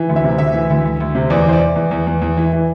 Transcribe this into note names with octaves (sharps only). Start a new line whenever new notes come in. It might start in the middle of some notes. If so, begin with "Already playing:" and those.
Already playing: E3
D2
E5
C3
D2 E5
E3
D2
D2
D2
C3
E2 D5
E3 C5
D5
E3
E2
E2
E2
E2
E3
E3